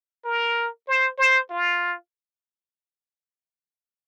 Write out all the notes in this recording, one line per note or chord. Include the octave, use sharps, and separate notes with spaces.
A#4
C5
C5
F4